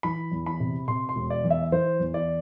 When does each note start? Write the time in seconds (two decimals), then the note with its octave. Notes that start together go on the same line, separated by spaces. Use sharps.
0.03 E3 B5
0.32 E2
0.46 B5
0.60 C3
0.88 C3 C6
1.09 C6
1.16 E1
1.30 D5
1.44 E2
1.50 E5
1.72 E3 C5
2.00 E2
2.14 D5